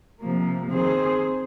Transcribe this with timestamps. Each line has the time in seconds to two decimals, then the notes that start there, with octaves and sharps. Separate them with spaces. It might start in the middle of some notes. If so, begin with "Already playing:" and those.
0.20 C3 F3 A#3
0.70 D#3 C4 G#4 C5